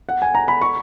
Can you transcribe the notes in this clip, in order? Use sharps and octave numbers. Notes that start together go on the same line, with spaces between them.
F#5
G#5
A#5
B5
C#6